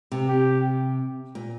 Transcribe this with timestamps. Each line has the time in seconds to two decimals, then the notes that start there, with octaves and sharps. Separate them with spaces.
0.12 C3
0.28 G4
1.35 A#2